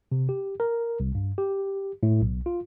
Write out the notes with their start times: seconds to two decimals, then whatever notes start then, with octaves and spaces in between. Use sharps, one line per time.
0.12 C3
0.29 G4
0.60 A#4
1.00 C2
1.15 G2
1.38 G4
2.03 A2
2.21 B1
2.46 F4